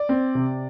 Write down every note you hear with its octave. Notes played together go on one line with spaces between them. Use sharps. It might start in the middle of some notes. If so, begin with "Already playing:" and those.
Already playing: D5
C4
C3